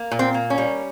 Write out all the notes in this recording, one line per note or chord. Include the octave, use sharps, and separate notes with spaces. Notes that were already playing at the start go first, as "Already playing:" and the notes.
Already playing: A#3
A#2
C4
A#3
C#4
G3